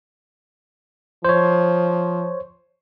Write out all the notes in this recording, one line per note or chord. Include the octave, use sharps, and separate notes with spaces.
F3 C5 C#5